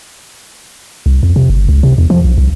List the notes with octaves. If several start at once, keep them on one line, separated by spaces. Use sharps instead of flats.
C2
F2
C3
G1
C#2
C3
E2
F3
B1
C2